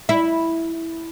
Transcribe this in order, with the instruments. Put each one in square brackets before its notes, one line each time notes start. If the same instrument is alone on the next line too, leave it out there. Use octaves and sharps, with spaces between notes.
[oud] E4